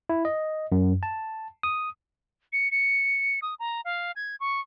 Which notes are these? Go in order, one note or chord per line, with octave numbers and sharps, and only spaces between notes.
E4
D#5
F#2
A5
D#6
C#7
C#7
D#6
A#5
F5
G#6
C#6